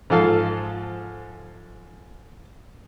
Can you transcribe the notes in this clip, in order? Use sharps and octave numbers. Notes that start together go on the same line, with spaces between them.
G#2 F3 A4 F5